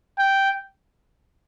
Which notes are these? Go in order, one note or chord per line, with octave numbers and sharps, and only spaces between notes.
G5